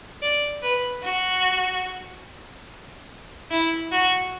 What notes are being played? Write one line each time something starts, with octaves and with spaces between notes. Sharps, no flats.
D5
B4
F#4
E4
F#4